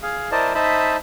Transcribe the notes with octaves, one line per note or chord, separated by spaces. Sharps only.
G#4 F5
E4 A#4 C5 D5 D#5 A5
D#4 C5 D#5 E5 A5 B5